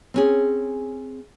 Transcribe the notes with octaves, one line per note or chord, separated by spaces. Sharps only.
C4 C#4 G#4